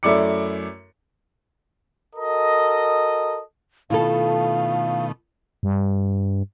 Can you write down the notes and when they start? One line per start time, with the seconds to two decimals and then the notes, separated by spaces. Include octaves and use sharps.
0.03 F#2 A3 E4 D5 D6 C#7
2.16 F#4 A4 A#4 D#5
3.90 B2 D#3 A3 E4 F4 A4 F5
5.63 G2